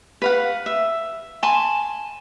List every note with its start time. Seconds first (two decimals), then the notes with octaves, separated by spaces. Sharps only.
0.22 B4 F5 F#5
0.66 E5
1.43 G#5 A5 B5 C6